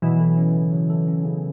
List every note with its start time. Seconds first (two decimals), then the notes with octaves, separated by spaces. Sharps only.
0.02 B2 E3 F#3
0.19 A4
0.37 C#4
0.55 C#3
0.72 F#3
0.90 A4
1.07 C#4
1.25 C#3